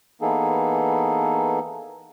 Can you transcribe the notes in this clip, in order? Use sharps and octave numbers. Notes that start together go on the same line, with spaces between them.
E3 A#3 B3 D#4 G#4 A4